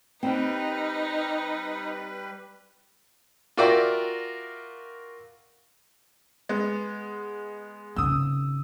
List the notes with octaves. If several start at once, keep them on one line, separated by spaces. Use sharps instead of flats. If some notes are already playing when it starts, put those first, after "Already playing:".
G3 C4 D#4 B4 G5
F4 F#4 A#4 D5 E5 G5
G#3 B3
G#1 C#3 D#6 E6